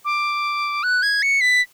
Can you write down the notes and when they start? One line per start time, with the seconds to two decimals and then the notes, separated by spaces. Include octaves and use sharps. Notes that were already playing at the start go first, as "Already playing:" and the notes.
0.05 D6
0.83 F#6
1.03 G#6
1.23 C#7
1.41 B6